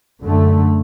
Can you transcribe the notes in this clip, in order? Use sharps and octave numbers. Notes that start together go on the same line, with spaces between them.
F#2 D3 A3